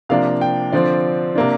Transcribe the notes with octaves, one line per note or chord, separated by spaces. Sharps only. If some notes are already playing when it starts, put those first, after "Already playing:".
C3 F3 A#3 D4 F5
G5
D3 F3 C4 D5
C3 A#3 D4